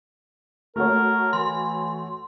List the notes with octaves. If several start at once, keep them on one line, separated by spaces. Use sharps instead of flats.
A3 F#4 A#4 C#5
E3 C6